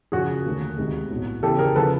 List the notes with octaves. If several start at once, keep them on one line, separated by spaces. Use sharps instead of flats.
F#2 C#3 F3 F#4 G#4
D#2 D3 F#3 A3
D2 C3 D#3 G#3
B1 A2 F#3
E2 C#3 E3 G4 A4
G#4 A#4
C#3 F3 A4 B4